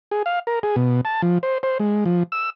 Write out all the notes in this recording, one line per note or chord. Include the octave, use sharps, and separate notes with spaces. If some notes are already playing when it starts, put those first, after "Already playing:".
G#4
F5
A#4
G#4
B2
A5
F3
C5
C5
G#3
F3
E6